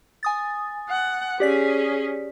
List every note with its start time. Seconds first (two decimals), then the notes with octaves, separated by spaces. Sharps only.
0.23 G#5 D#6 A6
0.90 F#5
1.40 C#4 G4 G#4 D5 B6